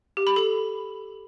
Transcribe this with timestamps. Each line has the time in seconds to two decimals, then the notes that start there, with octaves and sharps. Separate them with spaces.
0.17 G4
0.27 B5
0.36 A4